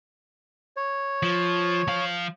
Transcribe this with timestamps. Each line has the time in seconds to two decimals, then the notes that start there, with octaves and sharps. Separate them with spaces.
0.77 C#5
1.23 F3
1.88 F3 F5